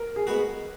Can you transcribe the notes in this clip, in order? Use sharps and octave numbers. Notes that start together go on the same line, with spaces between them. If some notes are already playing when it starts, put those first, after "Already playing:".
Already playing: A#4
G#4
G#3 B3 F#4